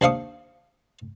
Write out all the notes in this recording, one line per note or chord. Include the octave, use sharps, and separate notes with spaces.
D#2 D4 C5 F5 C#6 D#6